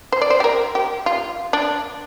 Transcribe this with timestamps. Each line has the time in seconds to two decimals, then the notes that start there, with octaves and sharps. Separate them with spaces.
0.12 C5
0.21 D5
0.30 C5
0.40 G4
0.44 A#4
0.75 G4
1.06 F4
1.53 D4